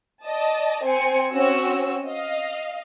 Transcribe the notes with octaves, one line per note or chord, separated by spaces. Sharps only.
D5 D#5 A5
C4 C5 G#5 C#7
C4 C#4 F#4 E6
D#5 F5